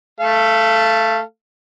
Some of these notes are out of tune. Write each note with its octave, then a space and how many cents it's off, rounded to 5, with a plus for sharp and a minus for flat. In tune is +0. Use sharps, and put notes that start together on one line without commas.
A3 +0 A4 +0 F5 -30